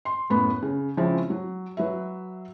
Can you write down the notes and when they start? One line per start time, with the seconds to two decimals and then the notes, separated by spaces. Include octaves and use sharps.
0.05 C6
0.30 F#2 A2 B3 B5
0.62 C#3
0.97 C#3 F3 G#3 C4 C#4 E4
1.30 F#3
1.77 F#3 B4 E5